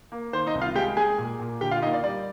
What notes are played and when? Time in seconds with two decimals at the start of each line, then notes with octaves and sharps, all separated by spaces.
0.12 A#3
0.33 D#3 C5
0.47 D#4 D#5
0.54 C2
0.61 F4 F5
0.75 G#3 G4 G5
0.97 G#3 G#4 G#5
1.18 A#2
1.40 A#2
1.61 D3 G4 G5
1.71 F4 F5
1.82 A#3 D#4 D#5
1.93 D5
2.04 G3 D5